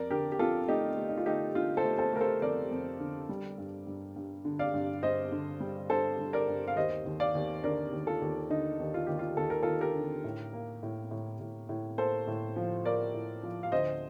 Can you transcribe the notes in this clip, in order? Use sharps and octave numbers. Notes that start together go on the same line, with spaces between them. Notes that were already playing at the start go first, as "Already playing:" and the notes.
Already playing: F2 A#4 D5
D3 G4 A#4
G4
F2 F4 A4
A3 D#4 G4
A3
D#4
F4
A3 D#4 G4
D3 F4
A4 C5
A3
A4 C5
A3 A#4
A4 C5
F2 A#4 D5
F2
D3
G3
G2
G2
G2
D3
D5 F5
G2
G2 C5 D#5
D3
G3
G2 A4 C5
G2
A#4 D5
G2
F5
D#2 C5 D#5
D#2
D5 F5
D#2
D3 A#4 D5
D#2
F4 A4
D#2
D3 D#4
D#2
F4
D#2 G4
F4
D#2 A4
A#4
D#2 F4 A4
G4 A#4
D3
A2
A#3
A2
A2
A2
A2
A#3 A4 C5
A2
F3
A#3 A#4 D5
A2
F3
F5
D2 C5 D#5